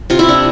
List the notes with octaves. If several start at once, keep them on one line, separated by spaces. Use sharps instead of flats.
C3 F4
E4
D4